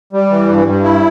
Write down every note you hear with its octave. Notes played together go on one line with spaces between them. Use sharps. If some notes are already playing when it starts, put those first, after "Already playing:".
G3
E3
G2
G2
E4